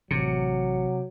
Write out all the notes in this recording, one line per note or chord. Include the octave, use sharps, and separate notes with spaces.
A1 C3 F#3 C#7